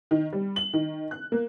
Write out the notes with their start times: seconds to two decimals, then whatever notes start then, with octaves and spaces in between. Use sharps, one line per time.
0.11 D#3
0.33 G3
0.56 F#7
0.73 D#3
1.11 F#6
1.32 A#3